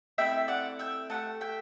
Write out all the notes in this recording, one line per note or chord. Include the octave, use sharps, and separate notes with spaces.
A3 C4 E4 A4 E5 G5
D5 F#5
E5 G5
A3 D4 G4 F#5 A5
E5 G5